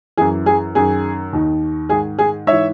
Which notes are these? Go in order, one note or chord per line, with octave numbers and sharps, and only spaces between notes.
F#2 E3 G#4
G#4
F#2 D#3 G#4
D#2 D#3
G#2 D#3 G#4
G#4
G#2 C#5 E5
E3